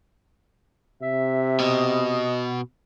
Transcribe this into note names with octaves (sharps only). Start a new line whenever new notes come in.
C3 E5
B2 D#5